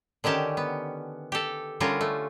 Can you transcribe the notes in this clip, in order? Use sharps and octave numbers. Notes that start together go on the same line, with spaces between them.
D3 D#3 C#4 G4 A5
B3
G4 A4
D3 G3 C#4 F4 A#4
A3